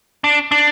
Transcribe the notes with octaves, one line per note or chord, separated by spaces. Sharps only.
D4
D4